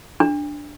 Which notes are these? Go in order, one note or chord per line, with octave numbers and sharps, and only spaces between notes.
D4